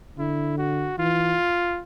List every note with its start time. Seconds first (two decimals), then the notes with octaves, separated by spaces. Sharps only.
0.19 D3 E4
0.58 F#4
0.99 E3 F4